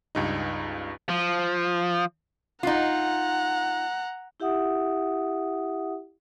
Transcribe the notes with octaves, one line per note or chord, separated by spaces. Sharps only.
C#2 G2 D#4
F3
D#4 F4 F#5 A#5
E4 G4 E5 F#5 D#6